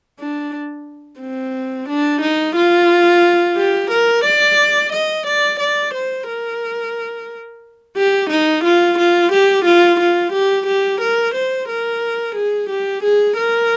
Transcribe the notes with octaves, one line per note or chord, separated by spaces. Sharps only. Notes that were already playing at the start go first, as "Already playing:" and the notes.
D4
C4
D4
D#4
F4
G4
A#4
D5
D#5
D5
D5
C5
A#4
G4
D#4
F4
F4
G4
F4
F4
G4
G4
A#4
C5
A#4
G#4
G4
G#4
A#4